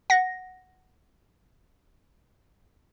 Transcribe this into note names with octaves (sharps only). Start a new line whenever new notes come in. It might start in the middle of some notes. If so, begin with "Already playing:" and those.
F#5 A#6